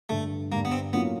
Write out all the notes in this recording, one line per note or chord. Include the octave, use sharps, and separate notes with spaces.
G2 D3 G3 A3
G2 D3 G3 A#3
B3
C4
A2 F#3 A#3 B3 C#4 F4